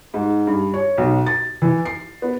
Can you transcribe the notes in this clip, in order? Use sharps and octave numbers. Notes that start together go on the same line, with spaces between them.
G#2
G2
C#5
B1
A6
E3
C7
B3